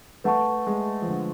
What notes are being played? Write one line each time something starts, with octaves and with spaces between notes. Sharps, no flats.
A3 B4 F#5 A5 C#6
G#3
F3
D3